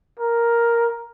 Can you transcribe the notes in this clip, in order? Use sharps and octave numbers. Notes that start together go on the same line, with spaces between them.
A#4